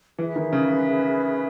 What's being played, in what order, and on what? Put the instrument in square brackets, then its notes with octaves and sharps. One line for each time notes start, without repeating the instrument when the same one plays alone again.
[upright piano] E3 [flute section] G#4 B4 E5
[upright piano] D#3
C#3